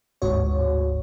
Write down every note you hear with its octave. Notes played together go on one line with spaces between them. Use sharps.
G1 D2 G#2 F#4 C#5